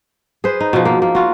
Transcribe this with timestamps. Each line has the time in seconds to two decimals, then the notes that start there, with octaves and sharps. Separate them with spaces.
0.44 G#4 B4 C5
0.61 D#4
0.73 B2 F3
0.85 A#3
1.02 A#3
1.15 F4 F#4